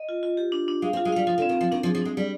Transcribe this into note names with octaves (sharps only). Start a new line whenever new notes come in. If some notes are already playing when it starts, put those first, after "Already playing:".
Already playing: D#5
F4
F4
G4
D4
D4
G#3 F5
C4
F4
G#3
G3 F5
F3 F4
D3
C4
D#3
F3 C4
D#3 D4
F3
G#4
F3
G#3 D4
G3 D5